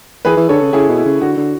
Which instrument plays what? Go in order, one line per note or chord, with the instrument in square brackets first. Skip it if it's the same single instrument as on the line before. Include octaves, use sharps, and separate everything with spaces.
[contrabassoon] E3 [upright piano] G#4 B4
[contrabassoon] E3
[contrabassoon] D3 [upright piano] A4 C#5
[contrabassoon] C#3
[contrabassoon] C#3 [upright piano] E4 G#4
[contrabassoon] B2
[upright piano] E4
[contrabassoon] C#3
[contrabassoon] D3 [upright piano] F#4
[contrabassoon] D3